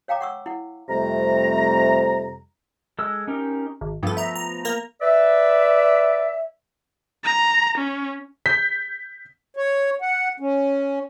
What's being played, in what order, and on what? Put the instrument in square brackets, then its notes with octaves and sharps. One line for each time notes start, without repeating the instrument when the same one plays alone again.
[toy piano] C#5 F5 G5 A#5 D6
F#5 C#6 E6
E4 F#5
[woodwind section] F2 C3 G3 A3 A#5
[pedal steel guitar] G#3 A4 E6
C#4 D#4 G4 A#4
[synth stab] G#1
[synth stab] G2 A4 [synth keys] F3 A3 B3
[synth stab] E5 A#5
A#5
A#3 A#4 A#5
[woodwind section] B4 D5 E5
[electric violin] A#5
C#4
[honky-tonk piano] G6 B6
[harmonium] C#5
F#5
C#4